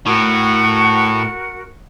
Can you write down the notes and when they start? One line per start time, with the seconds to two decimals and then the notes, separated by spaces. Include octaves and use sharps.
0.06 A2 F#4 A#4 F#5